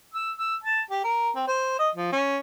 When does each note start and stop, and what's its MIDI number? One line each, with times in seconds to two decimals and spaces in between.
0.14 0.31 88
0.38 0.55 88
0.64 0.81 81
0.91 1.01 67
1.04 1.30 70
1.35 1.44 60
1.47 1.77 72
1.79 1.89 75
1.95 2.12 53
2.12 2.39 61